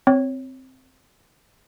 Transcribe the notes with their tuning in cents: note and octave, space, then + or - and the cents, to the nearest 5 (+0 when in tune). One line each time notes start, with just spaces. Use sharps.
C4 +0 C#5 +0